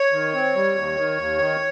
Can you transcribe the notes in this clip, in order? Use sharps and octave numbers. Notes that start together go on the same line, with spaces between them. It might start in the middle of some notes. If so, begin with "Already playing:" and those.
Already playing: C#5
D#3
C4
G3
D#2
D#3
D#2
D#3